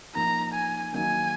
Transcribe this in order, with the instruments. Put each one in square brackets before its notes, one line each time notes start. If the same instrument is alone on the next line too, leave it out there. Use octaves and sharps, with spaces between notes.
[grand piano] F3 A#3 D#4 [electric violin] A#5
[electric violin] G#5
[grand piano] D#3 F#3 A#3 D#4 [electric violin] G#5